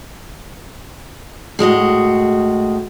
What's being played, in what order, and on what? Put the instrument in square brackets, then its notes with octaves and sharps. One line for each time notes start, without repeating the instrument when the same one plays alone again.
[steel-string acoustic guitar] A2 G#3 F#4 D#5